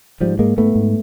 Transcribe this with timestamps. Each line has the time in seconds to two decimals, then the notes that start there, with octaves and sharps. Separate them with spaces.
0.20 G#2 F3 G3
0.39 G#2 G#3 A#3
0.57 G#2 A3 B3
0.75 G#2